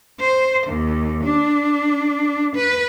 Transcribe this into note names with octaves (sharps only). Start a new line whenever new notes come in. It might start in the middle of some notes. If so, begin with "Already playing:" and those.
C5
D#2
D4
B4